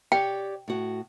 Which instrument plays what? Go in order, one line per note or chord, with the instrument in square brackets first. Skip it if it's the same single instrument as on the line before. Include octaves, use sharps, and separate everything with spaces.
[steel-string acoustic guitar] G4 C#5 D5 [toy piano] G5
[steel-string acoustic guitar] A2 F#4